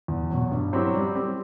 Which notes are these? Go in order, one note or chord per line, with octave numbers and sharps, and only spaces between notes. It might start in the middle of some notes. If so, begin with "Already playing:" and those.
E2
B2 F#3
G2
F#3 C4 E4 G4
G3
C4 G4